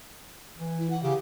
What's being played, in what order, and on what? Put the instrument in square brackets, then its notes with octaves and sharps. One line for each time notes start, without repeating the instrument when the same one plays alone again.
[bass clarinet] E3
[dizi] E4
F#5
[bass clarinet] C#3 [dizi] G4